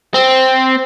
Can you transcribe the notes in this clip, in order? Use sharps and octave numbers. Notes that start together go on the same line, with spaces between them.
C4